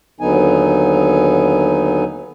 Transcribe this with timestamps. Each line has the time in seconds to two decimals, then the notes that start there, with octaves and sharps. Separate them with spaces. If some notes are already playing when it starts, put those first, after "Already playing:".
0.21 D#2 D3 F#3 B3 D#4 G#5